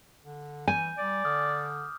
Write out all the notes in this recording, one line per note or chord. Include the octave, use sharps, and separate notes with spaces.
D3
E3 G#5 G6
G3 D5
D3 D6 D#6 F6